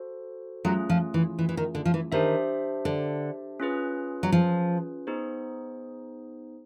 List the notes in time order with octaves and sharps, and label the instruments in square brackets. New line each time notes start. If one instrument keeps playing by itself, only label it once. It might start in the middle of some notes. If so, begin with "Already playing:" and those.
Already playing: [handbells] F#4 A4 C5
[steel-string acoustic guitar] F#3 [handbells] A3 C#4 F4 G#4
[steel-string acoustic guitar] F3
E3
E3
E3
D#3
D3
F3
E3
[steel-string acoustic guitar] D#3 [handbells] D4 G4 C5 E5
[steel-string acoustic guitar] D3
[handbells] C#4 F4 G#4 B4
[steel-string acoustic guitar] F#3
F3
[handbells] B3 D#4 G#4 C5